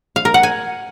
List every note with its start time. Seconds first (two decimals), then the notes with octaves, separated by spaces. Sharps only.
0.16 F5
0.25 A#4
0.34 F#5
0.43 G#5